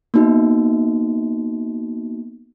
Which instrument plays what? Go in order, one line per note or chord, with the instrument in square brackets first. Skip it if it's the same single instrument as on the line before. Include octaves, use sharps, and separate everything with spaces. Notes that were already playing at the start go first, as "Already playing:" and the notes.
[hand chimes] A#3 B3 D#4 F#4